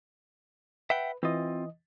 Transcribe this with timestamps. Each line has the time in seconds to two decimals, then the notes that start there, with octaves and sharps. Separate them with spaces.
0.90 B4 E5 F#5 G5
1.23 E3 C4 F4 D#5